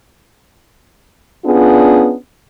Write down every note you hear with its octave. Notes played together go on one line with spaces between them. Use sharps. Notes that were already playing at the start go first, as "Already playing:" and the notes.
B3 C#4 D4 F4 G#4